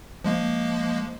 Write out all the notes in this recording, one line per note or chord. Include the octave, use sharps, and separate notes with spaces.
F3 G#3 A#3